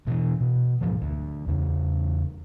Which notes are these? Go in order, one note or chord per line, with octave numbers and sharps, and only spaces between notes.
B2 E3
B2
D2 G#2 F3 F#3
D2
E2 C#3